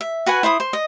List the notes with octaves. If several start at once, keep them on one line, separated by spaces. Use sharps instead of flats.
E5
F#4 B4 F#5 G#5
E4 C5 B5 D#6
C5
D#5